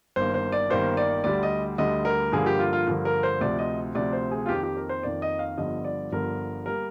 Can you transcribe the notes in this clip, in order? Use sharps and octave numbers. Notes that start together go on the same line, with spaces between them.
G1 G2 D#3 A#3 C5
C5
D5
G1 G2 D#3 A#3 C5
D5
D2 D3 G3 D5
D#5
D2 D3 G3 D#5
A#4
G2 D3 F3 A#3 G#4
G4
F4
F4
G2 D3 F3 A#3
A#4
C5
D2 C3 F3 D5
D#5
D2 C3 F3 D5
C5
G#4
F4
F2 D#3 A#3 G4
G4
A#4
C5
F2 D#3 A#3 D5
D#5
F5
G1 G2 D3 F3 D#5
D5
G1 G2 D3 F3 A#4
G3 A#3 A#4